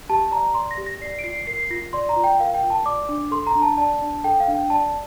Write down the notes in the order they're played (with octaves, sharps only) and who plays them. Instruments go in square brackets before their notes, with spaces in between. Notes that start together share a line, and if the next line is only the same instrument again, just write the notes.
[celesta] G4 A5
D5 A#5
D5 C6
A#6
G4
A#6
D5 C7
D7
F4 C7
A#4 C7
F4 A#6
D5 C6
A#5
F4
G5
A#4 F5
G5
F4
A5
D5 D6
D4 D6
A4 C6
A#5
D4
A5
D5 A5
D4
A4 G5
F5
D4
G5
D5 A5